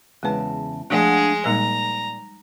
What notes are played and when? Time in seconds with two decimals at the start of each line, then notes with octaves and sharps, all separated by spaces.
0.23 E2 C#3 G#3 B4 A5
0.90 F3 G#3 A3 D4 G#4 F5 F#5
1.45 A#2 G3 G#3 D#4 A#5